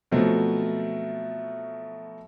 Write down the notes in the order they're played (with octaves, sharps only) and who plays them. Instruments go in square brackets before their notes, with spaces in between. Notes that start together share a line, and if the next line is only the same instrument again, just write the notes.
[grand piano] B2 F3 F#3 A3 C4